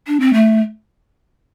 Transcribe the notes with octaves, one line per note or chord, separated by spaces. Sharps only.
D4
C4
A3